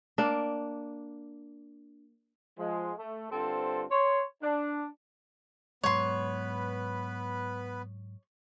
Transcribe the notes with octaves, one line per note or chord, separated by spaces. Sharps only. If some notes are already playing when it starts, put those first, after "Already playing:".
A#3 D4
F3 G#3
A3
G2 D3 C4 F4 A4 C5
C#5 C6
D4
G#2 F#3 G#3 B3 B4 C#5 C6